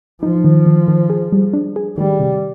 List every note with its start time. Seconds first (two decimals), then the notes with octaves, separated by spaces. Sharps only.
0.22 F3 D#4
0.45 D#3
0.66 D#3
0.88 D#3
1.10 G#4
1.32 G3
1.54 D4
1.76 G#4
1.98 D#3 G3
2.20 C3